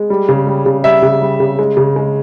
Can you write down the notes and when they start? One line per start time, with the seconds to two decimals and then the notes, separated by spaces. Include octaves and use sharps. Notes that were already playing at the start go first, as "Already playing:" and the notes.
Already playing: G#3
0.10 G3
0.29 C#3
0.47 G3
0.66 C#3
0.84 G3 E5
1.03 C#3
1.22 G3
1.40 C#3
1.59 G#3
1.77 C#3
1.96 G#3